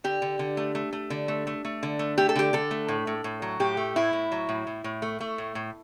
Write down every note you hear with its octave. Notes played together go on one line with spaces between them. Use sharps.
D3 G4
D3
D3
A3
A3
A3
D3
A3
A3
A3
D3
A3
A3 G4
A4
D3 G4
D3 A4
A3
A2
A2
A2
F#3
A2 G4
A3
A2 E4
A2
F#3
A2
A2
A2
A3
A3
A2
A2